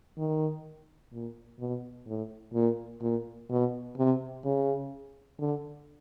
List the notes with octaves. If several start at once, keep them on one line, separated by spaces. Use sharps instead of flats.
D#3
A#2
B2
A2
A#2
A#2
B2
C3
C#3
D3